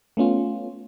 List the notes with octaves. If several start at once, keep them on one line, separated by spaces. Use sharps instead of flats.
A3 B3 C#4 F4